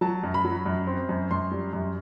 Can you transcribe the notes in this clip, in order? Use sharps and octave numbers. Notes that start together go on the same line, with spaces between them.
F#3 A5
F#2
B5
F#3
F#2
C4
F#2
F#2 C6
G3
F#2